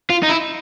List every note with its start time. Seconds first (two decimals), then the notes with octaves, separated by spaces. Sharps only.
0.10 F4
0.23 D#4
0.29 E4